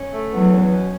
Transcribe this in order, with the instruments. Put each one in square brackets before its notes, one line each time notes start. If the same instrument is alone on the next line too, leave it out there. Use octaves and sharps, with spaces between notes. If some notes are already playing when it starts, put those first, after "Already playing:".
Already playing: [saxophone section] C#4
A3
[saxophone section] E2 [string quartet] F#3 B3
[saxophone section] C#4
B2